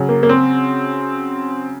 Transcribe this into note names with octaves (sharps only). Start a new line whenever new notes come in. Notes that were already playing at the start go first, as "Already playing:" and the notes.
Already playing: C#3 F#3
A#3
A#3
C4